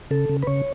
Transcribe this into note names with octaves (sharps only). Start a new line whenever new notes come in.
C#3 A4
C#3
B4
C#3 C#5